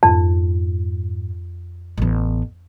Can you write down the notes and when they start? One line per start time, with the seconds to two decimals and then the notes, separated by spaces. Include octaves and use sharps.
0.03 F2 G#2
1.98 A1 B3